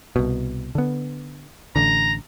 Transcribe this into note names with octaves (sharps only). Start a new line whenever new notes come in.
C2 B2
D3 B3
A1 D3 A#5